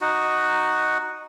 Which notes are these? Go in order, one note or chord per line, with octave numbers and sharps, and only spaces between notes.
D#4 F#4